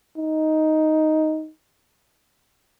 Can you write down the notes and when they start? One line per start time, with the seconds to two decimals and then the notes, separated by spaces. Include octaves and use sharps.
0.18 D#4